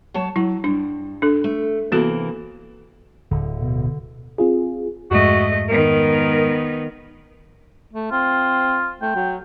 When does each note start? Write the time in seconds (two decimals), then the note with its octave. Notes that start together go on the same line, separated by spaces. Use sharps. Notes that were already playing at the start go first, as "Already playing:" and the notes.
0.14 F#3 C#5 A5
0.36 F#3 E4
0.64 G2 D4
1.22 D4 A4
1.44 A3
1.92 C3 E3 A#3 B3 F#4 A4
3.31 D1 D3
3.60 B2
4.38 C4 F4 G#4
5.11 F2 G#2 G#3 A3 F#4 D#5
5.69 D#3 B3 A#4
7.93 A3
8.11 C4 F4
9.02 A3 G5
9.15 F#3